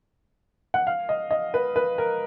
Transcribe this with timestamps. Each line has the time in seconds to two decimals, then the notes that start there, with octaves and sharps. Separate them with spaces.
0.74 F#5
0.87 F5
1.09 D#5
1.31 D#5
1.54 B4
1.76 B4
1.98 A#4